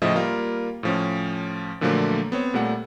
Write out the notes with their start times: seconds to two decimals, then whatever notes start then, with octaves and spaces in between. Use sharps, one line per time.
0.02 A2 C#3 F3 D#5 E5 D#6
0.16 G3 A#3 F4 A#4
0.83 A2 F3 C#4
1.81 A#2 D3 F3 F#3 A3 A#3
2.32 B3 C4 C#5
2.54 A#2 G3 A3 F#5